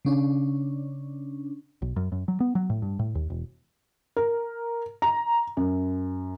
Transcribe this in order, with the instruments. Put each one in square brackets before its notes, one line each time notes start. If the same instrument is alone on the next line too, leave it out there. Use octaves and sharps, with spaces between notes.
[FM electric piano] C#3 C#4 D4
[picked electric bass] B1
F#2
F#2
F#3
B3
F#3
A2
G2
A2
D#2
E1
[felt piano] A#4
A#5
F#2